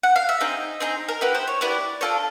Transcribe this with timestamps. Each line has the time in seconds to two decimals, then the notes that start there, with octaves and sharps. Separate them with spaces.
0.03 F#5
0.16 F5
0.29 E5
0.40 C4 D#4 G#4 D#5
0.80 C4 D#4 G#4
1.08 A#4
1.21 B3 E4 G4 B4
1.34 C5
1.47 C#5
1.61 B3 E4 G4 D5
2.01 D4 F4 A4 C#5